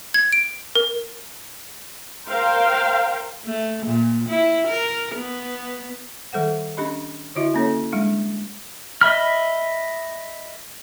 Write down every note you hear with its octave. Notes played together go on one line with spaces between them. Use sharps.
G#6
D7
A#4
A#4 C5 F5 G5
A3
A#2
E4
A#4
B3
D#3 G3 A4 C5 F#5
C#4 D4 G4 D#5 B5
D3 E4 F#4 D#5 E5 C6
A#3 C#4 A4 C#5
G3 G#3 D4
D#5 E5 B5 F6